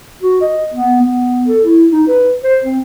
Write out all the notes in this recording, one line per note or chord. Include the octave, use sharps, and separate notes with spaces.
F#4
D#5
B3
B3
A4
E4
D#4
B4
C5
C4